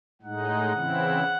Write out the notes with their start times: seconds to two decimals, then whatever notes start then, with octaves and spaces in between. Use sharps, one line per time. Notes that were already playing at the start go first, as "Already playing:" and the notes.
0.22 A2 G#3 D#4 F#5
0.73 C#3 E3 C4 E4